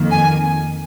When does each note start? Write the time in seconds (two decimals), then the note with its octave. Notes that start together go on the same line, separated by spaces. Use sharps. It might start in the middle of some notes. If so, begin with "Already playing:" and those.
Already playing: F2 D#3 A#3
0.11 G#5